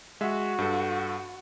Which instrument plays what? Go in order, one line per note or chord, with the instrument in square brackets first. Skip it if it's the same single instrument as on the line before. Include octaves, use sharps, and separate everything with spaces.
[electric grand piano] G#3 E5 [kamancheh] F#4
[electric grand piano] G2 A4